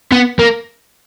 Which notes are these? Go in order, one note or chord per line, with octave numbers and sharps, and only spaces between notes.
B3
A#3